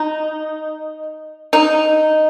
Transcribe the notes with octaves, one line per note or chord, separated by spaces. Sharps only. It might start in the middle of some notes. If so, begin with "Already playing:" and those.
Already playing: D#4
D#4